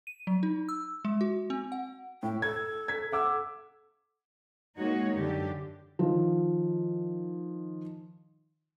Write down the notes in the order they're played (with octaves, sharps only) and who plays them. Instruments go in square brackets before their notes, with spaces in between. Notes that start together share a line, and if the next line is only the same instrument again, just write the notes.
[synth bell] D#7
F#3
D#4
E6
G#3
F#4
C4
F#5
[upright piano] A2 [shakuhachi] G5
[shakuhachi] A4 [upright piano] G#6
[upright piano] G#6 B6
[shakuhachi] A4 [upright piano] F#5 D6 E6
[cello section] G#3 A#3 D#4 F#4 C#5
F#2 D3 G4
[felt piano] D#3 F3